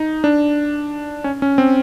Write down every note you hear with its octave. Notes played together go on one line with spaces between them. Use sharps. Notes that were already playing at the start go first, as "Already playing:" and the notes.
Already playing: D#4
D4
C#4
C#4
C4